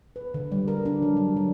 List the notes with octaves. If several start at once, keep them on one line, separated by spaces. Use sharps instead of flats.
B4
D3
G3
A#4
D4
F#3
G3
F#3